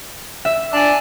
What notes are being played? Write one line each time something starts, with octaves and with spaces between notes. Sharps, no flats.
E5
D4 G#5 A5